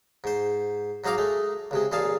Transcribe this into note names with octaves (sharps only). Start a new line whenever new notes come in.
G#2 C5
G#2 F#3 D#4 F5 A#5 D6
G#3 A3
C#2 C3 G#3
A1 A#2 G#4 F5 A5